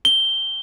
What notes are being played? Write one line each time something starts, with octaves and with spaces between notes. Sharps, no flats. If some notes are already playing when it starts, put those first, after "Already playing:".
G7